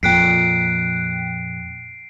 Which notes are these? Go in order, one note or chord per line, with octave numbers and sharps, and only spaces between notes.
F2 A#2 G5 F#6 B6 C7 D7